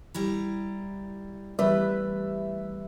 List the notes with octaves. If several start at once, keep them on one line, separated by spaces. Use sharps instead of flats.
G3 E4 A#5
E3 G3 A3 B4 E5